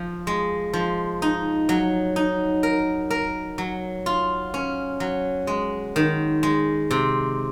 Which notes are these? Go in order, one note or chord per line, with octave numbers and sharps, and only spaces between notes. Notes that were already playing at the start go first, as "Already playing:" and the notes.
Already playing: F3
G#3
F3
D#4
F#3
D#4
A#4
A#4
F#3
F4
C#4
F#3
G#3
D#3
G#3
C3